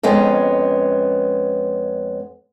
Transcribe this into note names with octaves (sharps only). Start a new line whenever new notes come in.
F2 G#3 B3 C#4